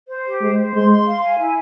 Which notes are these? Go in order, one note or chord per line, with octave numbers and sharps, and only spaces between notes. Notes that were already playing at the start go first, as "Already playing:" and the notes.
C5
G4
G#3 C5
C5
G#3 C6
C6
F5
G#5
E4